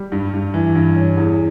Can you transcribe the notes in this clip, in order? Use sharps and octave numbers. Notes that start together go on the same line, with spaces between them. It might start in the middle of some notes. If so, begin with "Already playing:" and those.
Already playing: G3
G2
G2
E3
G2
C#4
E2